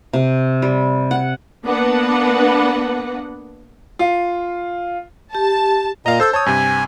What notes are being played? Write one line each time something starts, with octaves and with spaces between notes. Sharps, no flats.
C3
G3
F#5
A#3 B3 D4 B4 F#5
F4
G4 A5
A#2 D#5 F5 A#5
A4 C5 E6 G6
C#5 A5 D#6
G2 C3 G#5